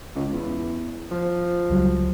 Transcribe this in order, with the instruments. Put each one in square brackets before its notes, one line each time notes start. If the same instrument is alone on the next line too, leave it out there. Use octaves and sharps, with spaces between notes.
[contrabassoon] C#2
E2
F3
[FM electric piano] C#2 F#3 G3